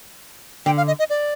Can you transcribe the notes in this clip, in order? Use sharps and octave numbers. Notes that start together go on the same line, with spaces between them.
D3 G5
F5
D#5
D#5
D5